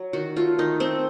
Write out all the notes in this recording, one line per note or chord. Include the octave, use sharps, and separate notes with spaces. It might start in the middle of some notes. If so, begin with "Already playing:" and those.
Already playing: F#3
D#3 F#4
A3 F4
D#3 D#4
A3 C4